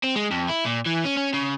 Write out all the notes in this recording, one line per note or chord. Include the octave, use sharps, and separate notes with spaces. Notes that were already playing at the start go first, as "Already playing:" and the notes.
C4
G#3
F2
E4
A#2
E3
C#4
C#4
C#3